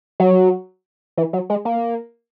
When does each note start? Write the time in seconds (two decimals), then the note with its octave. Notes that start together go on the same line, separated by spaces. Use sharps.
0.20 F#3
1.17 E3
1.33 F#3
1.50 G#3
1.65 A#3